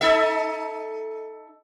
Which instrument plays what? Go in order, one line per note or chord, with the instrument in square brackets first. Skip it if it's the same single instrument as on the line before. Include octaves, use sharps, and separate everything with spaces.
[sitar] D#4 A4 E5